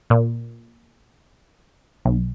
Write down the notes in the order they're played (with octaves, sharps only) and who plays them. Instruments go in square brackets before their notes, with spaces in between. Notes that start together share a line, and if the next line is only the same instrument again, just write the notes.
[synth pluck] A#2
B1